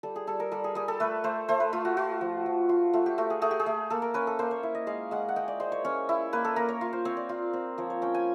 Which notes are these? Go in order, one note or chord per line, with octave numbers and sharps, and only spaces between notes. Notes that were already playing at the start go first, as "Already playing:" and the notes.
G3 A4
G#4
G3 A4
A#4
G3 A4
G#4
G3 G#4
A4
A3 B4
A3 C5
A3 C5
B4
A3 F4
F#4
F4 F#4
F3
F3
F4
A3 F4
G4
A3 F#4
G#4
A3 G#4
G4
G#4
A3
A#3 A4
A#4
C#4 B4
A4
A#3 C5
C#5
E4
D#5
G#3 F5
G#3 F#5
F#5
G#3 G5
D5
G#3 C5
C#5
C#4 C#5
E4
A#3 B4
A4
A#3 A#4
C#5
F4
C5
C4 C#5
D5
F4
C4
F3 C#5
C#5
C#4 G5
G#5